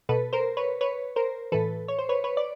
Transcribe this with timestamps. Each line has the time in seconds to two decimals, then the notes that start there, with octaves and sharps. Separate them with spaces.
0.09 B2 A4 B4
0.33 A#4 C5
0.57 B4 C#5
0.81 B4 C#5
1.16 A#4 C5
1.52 A2 E3 A4 B4
1.88 C#5
1.99 C5
2.09 B4 C#5
2.24 B4 C#5
2.37 D5